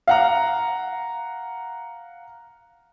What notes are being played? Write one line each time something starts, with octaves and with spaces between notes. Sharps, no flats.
F5 F#5 A#5